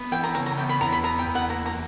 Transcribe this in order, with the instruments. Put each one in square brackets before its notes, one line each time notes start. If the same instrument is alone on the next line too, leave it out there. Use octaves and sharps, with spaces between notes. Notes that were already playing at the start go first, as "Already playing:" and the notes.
Already playing: [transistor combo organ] B3
[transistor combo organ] E3 [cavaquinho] G5
[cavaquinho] A#5
[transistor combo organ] C#3 [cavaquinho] A#5
[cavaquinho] A#5
[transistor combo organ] B3 [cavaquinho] G5
[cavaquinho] B5
[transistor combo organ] E2 [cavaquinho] A#5
[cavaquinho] B5
[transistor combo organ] B3 [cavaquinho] A#5
[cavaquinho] G5
[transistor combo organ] E2
[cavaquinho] F#5
[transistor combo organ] A#3 [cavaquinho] A#5
[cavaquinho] A#5